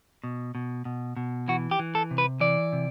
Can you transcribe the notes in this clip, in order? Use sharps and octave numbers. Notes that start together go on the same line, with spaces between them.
B2
B2
B2
B2
E3 F#4
G4
E3
A4
C3
B4
E3 D5
C3